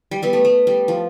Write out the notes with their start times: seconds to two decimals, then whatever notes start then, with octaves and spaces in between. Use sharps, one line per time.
0.11 G3
0.23 G3 B3
0.33 A3
0.45 A3
0.67 G3
0.88 F3